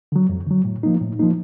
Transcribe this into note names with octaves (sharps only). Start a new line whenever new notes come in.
D3 F#3
F2
D3 F#3
A2
F3 A#3 D#4
A2
F3 A#3 D#4